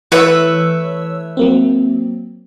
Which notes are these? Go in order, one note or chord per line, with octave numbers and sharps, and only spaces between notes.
E3 A3 B4 C#5 E5 E6
F#3 A#3 C4